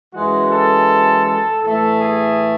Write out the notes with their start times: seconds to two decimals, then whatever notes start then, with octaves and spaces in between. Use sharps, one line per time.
0.14 F#2 E3 G#3 F#4
0.51 A4
1.25 A4
1.62 A2 E3 A3 A4
2.00 G#4